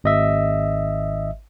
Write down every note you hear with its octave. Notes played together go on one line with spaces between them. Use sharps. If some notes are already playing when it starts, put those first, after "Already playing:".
G#1 D#5 E5